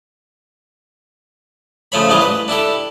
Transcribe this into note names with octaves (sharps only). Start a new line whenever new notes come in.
C#3 F3 A3 C#5 B5
A1 G3 G#3 D#5 F5 D6
B4
D4 E4 G4 A4